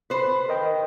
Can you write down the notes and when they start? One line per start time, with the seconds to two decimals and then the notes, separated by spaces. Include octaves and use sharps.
0.10 B4 C5
0.48 A#4 D#5 G5